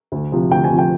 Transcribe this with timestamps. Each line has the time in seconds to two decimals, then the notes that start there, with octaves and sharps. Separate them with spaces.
0.12 D2
0.32 C3 F3
0.51 D2 G5
0.64 G#5
0.71 C3 F3
0.78 G5